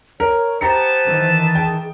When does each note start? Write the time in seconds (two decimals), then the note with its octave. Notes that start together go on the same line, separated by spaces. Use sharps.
0.20 A#4 C#5
0.61 B3 G4 C5 A5 A#5 C#7
1.08 D#3 E3
1.55 G#4 G5